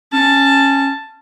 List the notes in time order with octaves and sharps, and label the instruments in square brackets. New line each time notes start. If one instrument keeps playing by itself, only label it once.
[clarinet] C#4 [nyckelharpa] A5